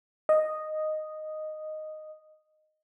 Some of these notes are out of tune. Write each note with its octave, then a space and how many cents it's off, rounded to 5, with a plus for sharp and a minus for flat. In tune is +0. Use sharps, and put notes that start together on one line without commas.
D#5 -5